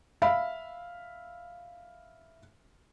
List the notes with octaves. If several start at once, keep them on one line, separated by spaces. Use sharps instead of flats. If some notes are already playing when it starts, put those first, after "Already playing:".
E5 F5 B5